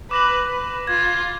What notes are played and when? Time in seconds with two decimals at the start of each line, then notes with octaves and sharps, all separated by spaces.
0.11 B4 D6 A#6 F#7
0.48 B4
0.87 F4 G#6